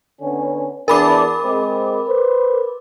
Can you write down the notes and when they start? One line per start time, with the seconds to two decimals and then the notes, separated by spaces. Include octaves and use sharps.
0.21 D3 B3 C#4
0.88 E2 D4 A#4 B5 D6
1.43 G#3 C4
2.08 B4 C5